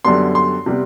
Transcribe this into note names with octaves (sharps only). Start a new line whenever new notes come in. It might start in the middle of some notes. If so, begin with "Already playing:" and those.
F#2 D3 G3 B3 C6
C6
C3 G3 B3